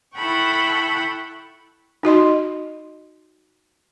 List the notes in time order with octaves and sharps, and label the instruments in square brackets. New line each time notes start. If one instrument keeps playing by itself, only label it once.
[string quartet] E4 A4 F#5 G5 B5 C#6
[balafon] D#4 F#4 D#5 C6